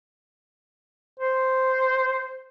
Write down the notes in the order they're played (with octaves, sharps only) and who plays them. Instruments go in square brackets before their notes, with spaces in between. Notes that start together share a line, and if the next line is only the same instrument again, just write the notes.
[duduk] C5